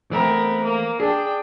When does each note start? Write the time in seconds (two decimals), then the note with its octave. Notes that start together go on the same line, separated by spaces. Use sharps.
0.11 E3 A3 B3 C4 A#4
0.64 A#3
1.00 D4 G#4 G5